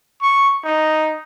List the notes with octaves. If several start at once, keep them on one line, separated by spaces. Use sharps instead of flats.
C#6
D#4